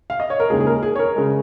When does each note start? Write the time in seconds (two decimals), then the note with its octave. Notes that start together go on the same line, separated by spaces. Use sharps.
0.10 F5
0.20 D#5
0.30 C#5
0.40 A#4
0.50 D#2 C#3 G#3 G#4
0.61 G#4
0.67 A#4
0.83 G#4
0.95 C#5
0.99 A#4
1.16 C#3 G#3